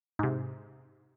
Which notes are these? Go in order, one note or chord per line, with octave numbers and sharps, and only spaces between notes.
G#2 C3